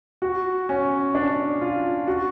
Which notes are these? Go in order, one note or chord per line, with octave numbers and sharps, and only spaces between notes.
F#4
C#4
D4
F4
F#4